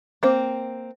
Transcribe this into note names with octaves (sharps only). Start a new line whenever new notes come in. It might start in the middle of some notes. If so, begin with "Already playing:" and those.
A#3 C4